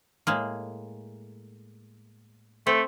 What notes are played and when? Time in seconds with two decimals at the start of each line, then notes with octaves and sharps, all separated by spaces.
0.27 A2 G#3 A#3
2.67 A3 C4